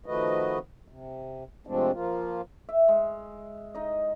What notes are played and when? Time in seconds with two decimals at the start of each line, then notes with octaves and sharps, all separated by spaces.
0.06 D#3 F3 A3 F#4 B4 D#5
0.88 C3
1.67 C3 F3 G#3 A3 C4 D4
1.92 F3 A#3 F4
2.69 E5
2.88 G#3
3.75 D#4 D#5